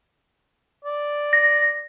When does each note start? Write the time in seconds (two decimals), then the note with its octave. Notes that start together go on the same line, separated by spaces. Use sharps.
0.84 D5
1.33 A#6